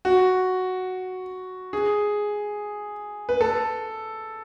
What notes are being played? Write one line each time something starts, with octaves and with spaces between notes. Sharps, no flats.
F#4
G#4
B4
A4